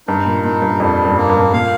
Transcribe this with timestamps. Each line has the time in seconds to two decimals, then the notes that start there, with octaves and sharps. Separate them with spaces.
0.07 G2 D#4
0.26 A#2
0.44 A#2 D#4
0.62 G2
0.80 F2 G3
1.05 G2
1.17 A#3
1.29 G2
1.36 A#2
1.43 G2
1.53 A#2 F5